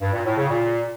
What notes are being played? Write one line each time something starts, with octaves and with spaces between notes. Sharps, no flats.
G2
A#2
A2
C#3
A#2